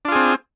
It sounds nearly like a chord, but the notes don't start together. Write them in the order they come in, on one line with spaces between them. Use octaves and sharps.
D4 F4 G#4 C4